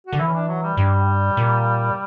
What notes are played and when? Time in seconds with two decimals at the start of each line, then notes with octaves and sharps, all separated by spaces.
0.07 F#4
0.13 D3
0.19 E3 E4
0.27 C#4
0.33 D4
0.48 F#3
0.63 G3
0.77 G2 G3
1.37 A#2